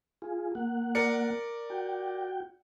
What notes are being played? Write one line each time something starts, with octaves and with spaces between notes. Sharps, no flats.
F4 G#4
A#3 F#5
A#4 D5 C#7
F#4 G5